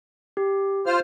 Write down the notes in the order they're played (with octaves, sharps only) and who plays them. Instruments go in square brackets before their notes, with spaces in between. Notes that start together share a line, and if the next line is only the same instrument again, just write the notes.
[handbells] G4
[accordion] F4 C5 F6